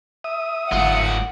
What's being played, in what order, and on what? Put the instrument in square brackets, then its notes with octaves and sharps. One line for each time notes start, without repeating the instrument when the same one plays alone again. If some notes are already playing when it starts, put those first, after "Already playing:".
[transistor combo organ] E5 D#6
[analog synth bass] G1 [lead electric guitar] G#2 F4 [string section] F#5